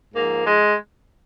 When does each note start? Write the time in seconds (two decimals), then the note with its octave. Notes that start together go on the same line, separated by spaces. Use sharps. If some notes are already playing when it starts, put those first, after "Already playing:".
0.14 G#2 F3 A#3
0.45 G#3